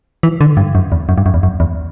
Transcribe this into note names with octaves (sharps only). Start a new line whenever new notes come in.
E3
D3
G2
F#2
E2
F#2
G2
F#2
E2
F#2
E2